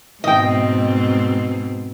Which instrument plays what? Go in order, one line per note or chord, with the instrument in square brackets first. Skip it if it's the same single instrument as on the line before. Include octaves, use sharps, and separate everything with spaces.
[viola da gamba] G#2 B2 C4 [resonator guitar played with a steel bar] D#5 G5